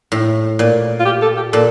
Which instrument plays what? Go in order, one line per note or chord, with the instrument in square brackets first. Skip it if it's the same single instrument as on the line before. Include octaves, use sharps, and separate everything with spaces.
[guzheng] A2
A#2
[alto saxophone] F4
G4
A4
G4
[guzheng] A#2 [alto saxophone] A4